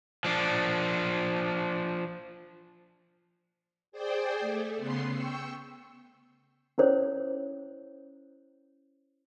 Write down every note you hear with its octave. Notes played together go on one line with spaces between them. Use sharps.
F3 D4
G#4 C5 D5 G5
A3
C#3 B3 C6 C7
G5 C#6 E6
C#4 E4 C5 C#5